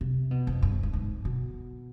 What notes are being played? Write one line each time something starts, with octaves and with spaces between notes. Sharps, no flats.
C3
B2
F2
G2
G#2
G#2
B2